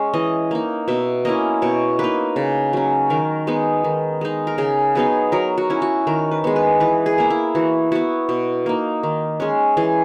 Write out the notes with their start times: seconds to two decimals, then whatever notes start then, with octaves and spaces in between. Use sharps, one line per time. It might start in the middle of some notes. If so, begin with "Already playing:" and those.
Already playing: G#3 C#4
0.14 E3 D#5
0.51 A#3 D#4
0.88 B2 E5
1.25 A#3 C#4 E4 D#5
1.62 B2 C#5
1.99 A#3 D#4 B4
2.36 C#3
2.73 F#3 C#4
3.10 D#3 A#4
3.47 G#3 B3 D#4
3.84 D#3
4.21 G#3 D#4
4.47 A#4
4.58 C#3 G#4
4.95 F#3 B3 D#4 G#4
5.32 F#3 A#4
5.58 F#4
5.70 C#4 E4
5.82 F#4
6.07 D#3 A#4
6.31 B4
6.44 G#3 B3
6.56 B4
6.80 E3 B4
7.06 G#4
7.18 A#3 E4
7.30 E4
7.55 E3 F#4
7.92 B3 E4 F#4
8.29 B2
8.66 A#3 D#4
9.03 D#3
9.40 G#3 C#4
9.77 E3 G#4